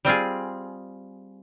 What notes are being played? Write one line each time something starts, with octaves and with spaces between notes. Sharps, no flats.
G3 C4 F4 G#4